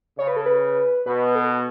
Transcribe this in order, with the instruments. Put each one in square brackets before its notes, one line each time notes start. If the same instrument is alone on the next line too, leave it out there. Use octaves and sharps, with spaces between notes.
[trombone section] C#3 [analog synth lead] C#5
[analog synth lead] B4
A4
B4
[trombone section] B2 [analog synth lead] B4
[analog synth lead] A4